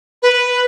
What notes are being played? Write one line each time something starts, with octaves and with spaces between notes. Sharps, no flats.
B4